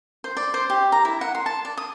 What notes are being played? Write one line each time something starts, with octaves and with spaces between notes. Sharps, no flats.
C5
D5
C5
G4
A#5
E4
F#5
C6
A5
D5
D#6